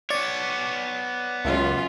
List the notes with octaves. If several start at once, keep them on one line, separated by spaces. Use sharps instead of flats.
B3 C#5 D5 D6 A6
C#2 F#2 C#4 F4